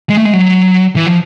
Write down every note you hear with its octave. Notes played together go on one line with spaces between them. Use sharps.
G#3
A3
G#3
F#3
E3
F3